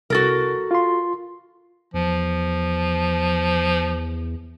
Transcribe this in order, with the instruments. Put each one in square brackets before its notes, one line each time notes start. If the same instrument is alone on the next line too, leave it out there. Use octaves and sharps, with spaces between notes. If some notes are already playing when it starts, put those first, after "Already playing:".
[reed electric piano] C2 A6 [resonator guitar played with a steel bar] F#4 A4 A#4
[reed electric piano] F4 C6
[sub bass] E2 [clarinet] F3